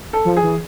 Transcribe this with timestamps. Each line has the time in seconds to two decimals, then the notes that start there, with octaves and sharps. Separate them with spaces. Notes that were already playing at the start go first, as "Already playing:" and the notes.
0.13 A4
0.25 F3
0.37 G#4
0.43 E3